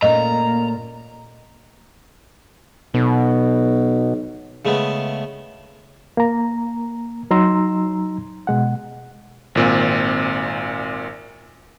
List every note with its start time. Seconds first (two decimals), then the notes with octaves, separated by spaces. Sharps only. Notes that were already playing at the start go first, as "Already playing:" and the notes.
0.02 A#2 A3 A#3 C#4 D#5 A#5
2.94 B1 B2
4.65 C#3 G#3 A3 B3
6.17 A#3 A#5
7.31 F#3 D#4 A#5 C6 E6
8.47 B2 G#3 F#5
9.55 G#1 A#2 C4